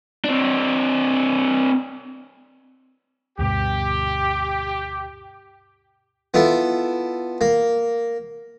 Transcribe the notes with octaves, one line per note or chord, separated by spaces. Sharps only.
C4 D4
D2 G2 B2 G4
B3 E4 F4 A4
A#3